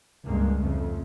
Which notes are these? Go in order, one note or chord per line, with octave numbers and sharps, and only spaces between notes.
C#2 G2 G#3 A#3
F2 C#3 A3